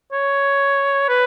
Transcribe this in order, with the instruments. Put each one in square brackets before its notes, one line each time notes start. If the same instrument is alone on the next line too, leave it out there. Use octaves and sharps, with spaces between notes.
[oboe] C#5
B4